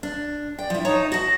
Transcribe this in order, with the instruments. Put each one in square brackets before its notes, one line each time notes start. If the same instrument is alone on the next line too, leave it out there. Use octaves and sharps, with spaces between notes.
[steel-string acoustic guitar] D4
[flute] D5 [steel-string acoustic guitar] G5
[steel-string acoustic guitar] F3 E4
[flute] D#4 [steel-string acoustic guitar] C#5 A5 A#5
[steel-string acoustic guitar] F#4 A5 [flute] A#6